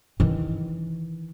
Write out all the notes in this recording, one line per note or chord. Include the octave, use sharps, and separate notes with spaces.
D#3 E3